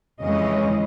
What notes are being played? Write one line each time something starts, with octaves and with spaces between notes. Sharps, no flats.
F2 C#3 E3 G#3 C#4 D#5